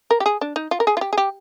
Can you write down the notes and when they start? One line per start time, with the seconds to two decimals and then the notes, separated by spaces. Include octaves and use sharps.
0.11 A#4
0.20 G4
0.26 G#4
0.41 D4
0.56 D#4
0.71 F4
0.80 A#4
0.87 G#4
0.97 F4
1.01 G4
1.13 G#4
1.18 G4